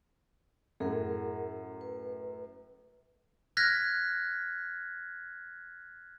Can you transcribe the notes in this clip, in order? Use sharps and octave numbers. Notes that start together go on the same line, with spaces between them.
F#2 A2 G#4 A#4 F#5
B4
F6 F#6 G#6 A#6 B6